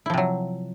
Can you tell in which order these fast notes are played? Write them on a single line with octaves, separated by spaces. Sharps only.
E4 F3 C3 F#3